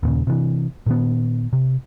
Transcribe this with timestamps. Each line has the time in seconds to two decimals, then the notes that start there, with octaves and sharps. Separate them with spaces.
0.03 D#2 A#2 C#3
0.27 C3 E3
0.86 A#2 D#3 B3
1.53 C3